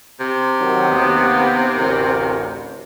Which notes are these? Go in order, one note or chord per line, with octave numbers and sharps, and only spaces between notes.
C3
D#3 F#3
D#2 B3
A1 D2 A#4